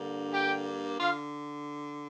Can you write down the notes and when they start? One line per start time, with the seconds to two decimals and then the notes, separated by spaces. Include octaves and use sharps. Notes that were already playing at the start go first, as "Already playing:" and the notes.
Already playing: G2 D3 A#3
0.30 G4 G5
0.99 D3 F4 F5